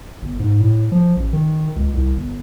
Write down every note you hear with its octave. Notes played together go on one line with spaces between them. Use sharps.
G1
G#2
A2
F3
A1
D#3
C#2
C2
G1